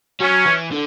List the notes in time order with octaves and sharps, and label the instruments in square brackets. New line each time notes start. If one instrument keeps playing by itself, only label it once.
[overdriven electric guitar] F#3 [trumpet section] C#4
[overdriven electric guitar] E3
D3